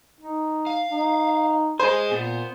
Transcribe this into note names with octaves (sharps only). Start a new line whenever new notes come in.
D#4
F5
D#4
G#4 C5 D#5 G#5
A#2 B3